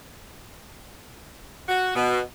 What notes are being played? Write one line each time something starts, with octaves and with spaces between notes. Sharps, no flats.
F#4
B2